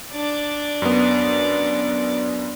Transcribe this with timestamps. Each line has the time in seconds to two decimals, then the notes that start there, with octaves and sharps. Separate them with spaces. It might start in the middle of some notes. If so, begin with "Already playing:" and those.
0.12 D4 D5
0.82 F#2 B3